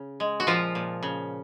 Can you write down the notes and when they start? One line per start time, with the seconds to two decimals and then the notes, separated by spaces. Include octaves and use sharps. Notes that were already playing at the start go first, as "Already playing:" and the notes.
Already playing: C#3
0.20 G#3
0.40 F#4
0.47 A#2 F3 F4
0.75 A#2
1.03 C#3